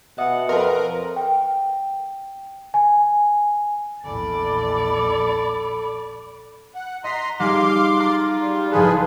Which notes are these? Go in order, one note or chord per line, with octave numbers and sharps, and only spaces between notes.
B2 D#5 E5 F#5 D#6
F2 A#4 B4 C6
G5
G#5
A#1 E2 A4 D5 B5
F#5
D#5 A#5 C6 B6
G3 D#4 G#4 F5 C6 D6
F4 A#5 F#6
G3
F#1 F3 G#4 A4 B4